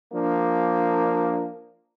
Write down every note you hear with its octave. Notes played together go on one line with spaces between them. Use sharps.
F3 A#3 D4